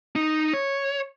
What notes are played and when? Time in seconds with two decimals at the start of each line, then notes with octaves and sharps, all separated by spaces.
0.16 D#4
0.54 C#5